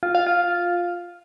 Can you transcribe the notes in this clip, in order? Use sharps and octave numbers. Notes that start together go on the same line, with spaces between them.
F4
F5
F4